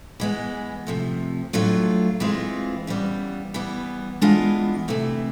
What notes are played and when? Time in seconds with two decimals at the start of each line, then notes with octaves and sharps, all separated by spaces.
0.20 E3 G#3 B3
0.87 C3 F3 A3
1.53 A2 F#3 A3 D4 F4
2.20 E3 G#3 C4 F4
2.87 C#3 E3 G3 B3
3.54 E3 G3 B3
4.21 E3 G#3 B3 D4 F4
4.88 C3 E3 A3